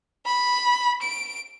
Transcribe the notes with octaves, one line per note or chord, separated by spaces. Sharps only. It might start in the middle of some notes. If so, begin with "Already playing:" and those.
B5
D7